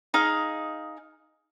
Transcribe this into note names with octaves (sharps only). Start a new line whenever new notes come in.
D#4 G#4 F5